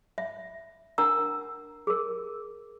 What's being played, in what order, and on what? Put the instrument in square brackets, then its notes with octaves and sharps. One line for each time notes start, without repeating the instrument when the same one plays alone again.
[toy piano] E5
D4 A#4 F#5 A#5 E6
G#4 A#4